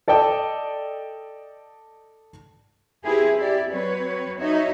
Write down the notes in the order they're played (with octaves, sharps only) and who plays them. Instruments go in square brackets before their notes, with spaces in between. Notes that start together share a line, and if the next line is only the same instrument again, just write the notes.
[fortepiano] A4 D5 D#5 G5 A5
[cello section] C4 E4 G4 G#4 B4
E4 G4 D5
F#3 C4 B4 C#5
D#4 F#4 C#5 E5